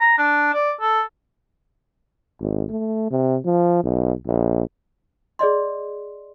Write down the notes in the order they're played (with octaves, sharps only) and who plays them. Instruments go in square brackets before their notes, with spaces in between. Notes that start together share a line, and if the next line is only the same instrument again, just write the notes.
[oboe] A#5
D4
D5
A4
[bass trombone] G#1
A3
C3
F3
B1
A#1
[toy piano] G#4 D5 D#5 C6